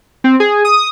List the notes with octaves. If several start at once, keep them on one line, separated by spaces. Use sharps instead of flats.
C4
G#4
D#6